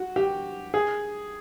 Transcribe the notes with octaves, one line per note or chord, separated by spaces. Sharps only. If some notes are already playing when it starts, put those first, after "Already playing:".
Already playing: F#4
G4
G#4